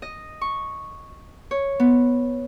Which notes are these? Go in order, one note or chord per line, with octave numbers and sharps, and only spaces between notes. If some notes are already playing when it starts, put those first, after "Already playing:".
D#5
C#6
C#5
B3